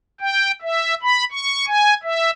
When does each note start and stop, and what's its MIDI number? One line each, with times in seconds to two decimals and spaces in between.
0.21 0.52 79
0.62 0.95 76
1.02 1.24 83
1.32 1.65 85
1.67 1.94 80
2.04 2.31 76